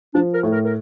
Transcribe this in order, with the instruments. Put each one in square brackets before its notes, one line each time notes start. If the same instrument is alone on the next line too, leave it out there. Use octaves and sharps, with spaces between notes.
[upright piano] F3 [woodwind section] D4
[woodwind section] A#4
[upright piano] A2
[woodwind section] A#4
A#4